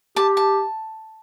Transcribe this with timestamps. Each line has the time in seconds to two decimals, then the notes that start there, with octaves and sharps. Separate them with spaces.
0.16 G4 A5
0.37 A5